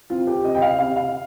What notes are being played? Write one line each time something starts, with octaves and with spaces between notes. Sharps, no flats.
C4 F4
G4
C3 D#5
G5
F5
C3 F5
F5